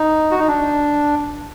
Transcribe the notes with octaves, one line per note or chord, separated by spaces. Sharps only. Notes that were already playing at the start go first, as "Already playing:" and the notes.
Already playing: D#4
F#4
D#4
D4